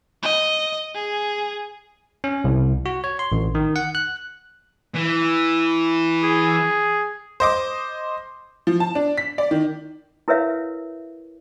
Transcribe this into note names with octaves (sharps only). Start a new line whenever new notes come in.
D#5
G#4
C#4
C2
F#4
C#5
C6
A1
D#3
F#5
F#6
E3
G#4
C5 D#5 D6
F3
A5
D4
B6
D5
D#3
E4 A#4 B4 C#5 E5 F5